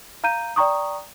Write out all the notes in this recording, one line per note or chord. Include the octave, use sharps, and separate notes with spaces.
F5 A#5 G6 D#7
D5 G5 A#5 C#6 D#6